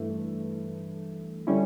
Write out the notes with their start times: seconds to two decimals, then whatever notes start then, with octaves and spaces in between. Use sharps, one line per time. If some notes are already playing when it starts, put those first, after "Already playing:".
Already playing: G2 E3 A3
1.47 D3 G3 C#4 E4